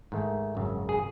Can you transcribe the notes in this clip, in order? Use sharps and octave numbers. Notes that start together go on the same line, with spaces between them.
G#2 D#3 A3
G#1 F#2 C#3
G#4